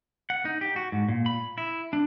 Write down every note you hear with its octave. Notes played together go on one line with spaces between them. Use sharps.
F#5
D#4
G4
F#4
G#2
A#2
B5
E4
D4